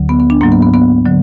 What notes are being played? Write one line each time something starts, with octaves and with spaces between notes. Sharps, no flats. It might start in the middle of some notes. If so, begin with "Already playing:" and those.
Already playing: D2 D3 F#3
B3
B3
D4
G#2 F#3 A#3
B3
B3
B3
D3 F#3